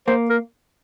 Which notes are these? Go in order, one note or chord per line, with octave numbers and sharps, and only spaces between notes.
A#3 C5
A#4